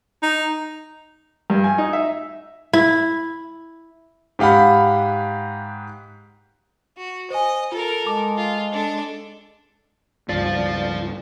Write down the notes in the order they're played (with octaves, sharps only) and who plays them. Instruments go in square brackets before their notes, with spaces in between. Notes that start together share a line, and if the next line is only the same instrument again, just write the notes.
[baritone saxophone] D#4
[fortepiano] G2
G#5
D#4
E5
[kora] E4
[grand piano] G#2 G4 F5 F#5 B5
[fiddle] F#4
[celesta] C5 G#5 [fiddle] D#5
[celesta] F4 [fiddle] A4 A#4
[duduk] G#3 [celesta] A5 D6
[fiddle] F4
D4 A4
[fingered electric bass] C#2 G2 [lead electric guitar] F4 C5 [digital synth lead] D5